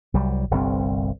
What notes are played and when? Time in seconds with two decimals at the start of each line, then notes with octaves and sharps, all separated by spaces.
0.14 C2 F#3 G3
0.51 G1 C2 G2 C4